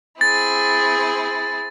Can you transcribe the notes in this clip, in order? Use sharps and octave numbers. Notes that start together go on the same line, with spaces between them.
C4 E4 G#4 A6